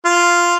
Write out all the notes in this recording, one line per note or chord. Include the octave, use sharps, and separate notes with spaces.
F4